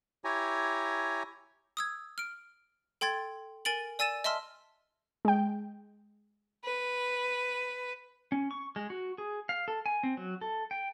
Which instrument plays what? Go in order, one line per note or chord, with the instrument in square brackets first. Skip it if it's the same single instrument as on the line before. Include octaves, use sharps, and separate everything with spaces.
[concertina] E4 G4 C#5 G#5 A#5
[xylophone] D#6 E6 G#6
F6 D7
A4 G5 C6 G#6 A6
A#4 G#5 A6 D7 F#7
D5 G#5 E6 A6 D#7 E7
D#5 E5 A5 C6 E6 F6
[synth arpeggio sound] G#3 G5
[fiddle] B4
[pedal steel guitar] C#4
C#6
G#3
F#4
G#4
F5
A4
G#5
C4
F#3
A4
G5